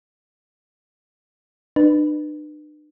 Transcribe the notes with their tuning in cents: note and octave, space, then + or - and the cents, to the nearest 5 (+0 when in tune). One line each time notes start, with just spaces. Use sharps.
D4 +45 B4 +0